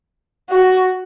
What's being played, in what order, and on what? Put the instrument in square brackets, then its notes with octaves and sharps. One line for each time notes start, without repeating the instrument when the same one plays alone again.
[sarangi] F#4